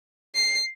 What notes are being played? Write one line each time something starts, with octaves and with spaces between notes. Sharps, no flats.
C7